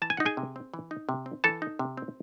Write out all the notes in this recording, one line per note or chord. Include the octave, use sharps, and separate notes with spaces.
E3 A5
G#5
F#5
D#4
G#4 G#5
C3
C4
E3
D#4
C3
C4
E3 A4 A5
D#4
C3
C4